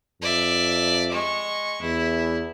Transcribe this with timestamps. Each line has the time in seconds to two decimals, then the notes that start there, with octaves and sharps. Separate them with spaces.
0.22 F2 D5 E5
1.12 G#3 C#6
1.82 E2 E4